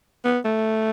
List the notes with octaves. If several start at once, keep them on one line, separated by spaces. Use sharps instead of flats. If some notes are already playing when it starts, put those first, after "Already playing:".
B3
A3